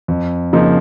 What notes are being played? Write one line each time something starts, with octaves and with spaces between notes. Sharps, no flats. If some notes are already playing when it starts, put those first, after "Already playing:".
F2
C#3 F3 A#3 D#4